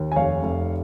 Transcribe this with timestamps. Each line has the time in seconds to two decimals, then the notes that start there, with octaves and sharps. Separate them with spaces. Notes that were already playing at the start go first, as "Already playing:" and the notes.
Already playing: D#2
0.12 G#5
0.16 F1 C#5 F5
0.43 F1